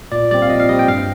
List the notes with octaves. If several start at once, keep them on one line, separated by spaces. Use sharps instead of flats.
A#2 D5
G3 C4 D5
F5
A#2 D#5
F5
G3 C4 D#5
G5
G2 F5